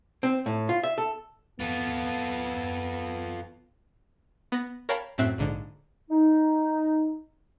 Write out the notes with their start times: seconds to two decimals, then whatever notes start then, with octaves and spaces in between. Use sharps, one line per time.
0.23 C4
0.46 A2
0.69 F4
0.83 E5
0.98 A4
1.60 B3 F4 A4
4.52 B3 A#6
4.89 A#4 C#5 F5 G5 A5 B5
5.18 F#2 A2 C4 E5 F#6
5.38 A#1 G#2 D3
6.10 D#4